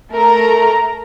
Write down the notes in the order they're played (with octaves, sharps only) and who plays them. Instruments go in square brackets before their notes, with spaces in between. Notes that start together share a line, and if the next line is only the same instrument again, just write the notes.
[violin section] A3 A#4 A#5